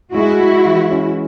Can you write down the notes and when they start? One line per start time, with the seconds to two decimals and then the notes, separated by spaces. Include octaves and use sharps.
0.14 G#3 E4 F#4
0.40 G#3
0.66 E3
0.91 C#4